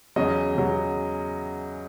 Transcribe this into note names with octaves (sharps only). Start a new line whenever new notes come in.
E2 C#3 F#3 D#5
E2 C#3 F#3